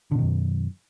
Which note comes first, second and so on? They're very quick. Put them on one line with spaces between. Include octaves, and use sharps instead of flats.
D3 B2 D#3 F#2